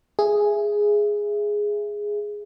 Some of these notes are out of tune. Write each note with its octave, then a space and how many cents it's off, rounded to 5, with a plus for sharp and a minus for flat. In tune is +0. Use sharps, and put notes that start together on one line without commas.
G#4 +0 E5 +15